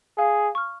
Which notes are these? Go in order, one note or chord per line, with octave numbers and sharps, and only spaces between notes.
G#4 F5
C#6 F6